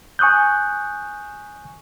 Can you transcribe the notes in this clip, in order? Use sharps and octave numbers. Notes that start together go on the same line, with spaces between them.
G#5 C#6 D#6 F#6 G6